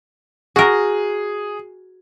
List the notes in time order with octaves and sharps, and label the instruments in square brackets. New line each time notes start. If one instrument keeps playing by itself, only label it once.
[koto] F#4 A#4 [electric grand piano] G#4